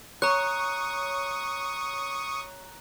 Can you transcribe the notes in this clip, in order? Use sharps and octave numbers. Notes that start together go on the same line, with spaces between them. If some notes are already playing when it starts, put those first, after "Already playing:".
C#5 A#5 C#6 D#6 F#6